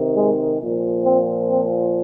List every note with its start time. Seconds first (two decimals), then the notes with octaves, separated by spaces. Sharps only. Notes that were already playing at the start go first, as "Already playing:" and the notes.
Already playing: C3 D#3
0.17 G#3
0.60 A#2 F3
1.05 C4
1.48 C4